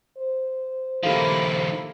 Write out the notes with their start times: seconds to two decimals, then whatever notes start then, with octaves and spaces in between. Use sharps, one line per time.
0.18 C5
1.03 D#3 F3 A#3 E4 F4 G4 A4 F5